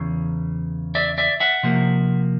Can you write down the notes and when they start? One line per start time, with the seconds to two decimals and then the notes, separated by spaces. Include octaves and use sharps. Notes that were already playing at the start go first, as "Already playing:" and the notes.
Already playing: E2 C#3
0.95 D5 E5
1.18 D5 E5
1.40 E5 F#5
1.63 C3 F3 A#3